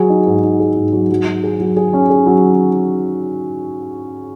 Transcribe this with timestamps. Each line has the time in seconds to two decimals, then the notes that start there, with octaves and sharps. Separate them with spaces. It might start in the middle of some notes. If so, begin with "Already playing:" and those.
Already playing: F#3 G#4
0.10 D#4
0.26 G#2
0.43 D#4
0.60 G#4
0.76 G#2
0.93 F#3
1.10 F#3
1.26 F#3
1.43 G#4
1.60 F#3
1.76 G#4
1.93 C#4
2.09 G#4
2.26 F#3